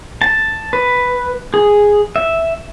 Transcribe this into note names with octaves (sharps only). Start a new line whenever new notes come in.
A5
B4
G#4
E5